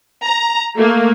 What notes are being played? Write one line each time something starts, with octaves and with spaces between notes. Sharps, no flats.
A#5
A3 A#3